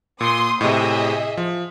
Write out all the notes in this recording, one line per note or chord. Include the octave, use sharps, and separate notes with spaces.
A#2 C6 D#6
A2 C3 G#4 D#5 E5
F3